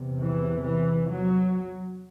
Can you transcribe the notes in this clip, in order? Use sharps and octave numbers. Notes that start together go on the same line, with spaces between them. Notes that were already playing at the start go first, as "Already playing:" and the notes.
Already playing: E2 C3
E3
E3
F#3